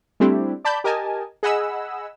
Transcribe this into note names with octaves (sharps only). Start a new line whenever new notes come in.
G3 A3 C4 D4 E4 G4
D5 A5 B5 G6
G4 A#4 D#5 G#5 A5
G#4 D#5 F#5 G#5 B5 E6